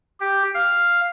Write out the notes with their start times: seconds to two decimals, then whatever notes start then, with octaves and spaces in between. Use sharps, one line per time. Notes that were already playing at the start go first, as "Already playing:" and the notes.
0.20 G4
0.54 F5